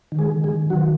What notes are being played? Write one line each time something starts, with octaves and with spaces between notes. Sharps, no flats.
D#3
G#3 G#4
D#3
G#3 G#4
D#3
D#3 F#3 F#4